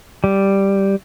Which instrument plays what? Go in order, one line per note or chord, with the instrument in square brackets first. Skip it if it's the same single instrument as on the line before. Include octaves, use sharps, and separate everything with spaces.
[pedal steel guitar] G3